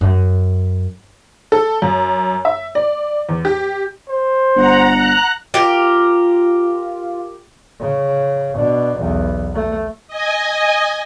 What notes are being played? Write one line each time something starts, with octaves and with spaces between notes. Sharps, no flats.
F#2
A4
F#2
E5
D5
E2
G4
C5
G1 F#5 A#5
A#5 F#6
F4 G4 A#4
C#3
B2 D4
B1 E2
A3
D#5 G#5